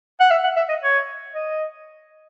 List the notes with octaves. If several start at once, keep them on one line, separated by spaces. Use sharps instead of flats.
F#5
E5
F#5
E5
D#5
C#5
D#5